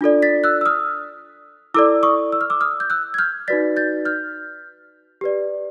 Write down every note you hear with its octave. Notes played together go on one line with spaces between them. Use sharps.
D4 F4 A4 D5
A6 B6
E6 F#6
E6
D#6 F6
E4 A4 D5 D6 E6
C#6 D#6
E6
F6
D6 E6
D#6 F6
G6
E6 F#6
G#6
F6 G6
D#4 F#4 B4 D5 A6 B6
G6 A6
F6 G6
G4 B4 D5